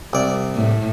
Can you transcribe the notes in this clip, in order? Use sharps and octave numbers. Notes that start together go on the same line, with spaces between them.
C2 D5
A2